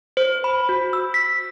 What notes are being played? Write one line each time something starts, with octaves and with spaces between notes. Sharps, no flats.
C5
B5
F#4
E6
B6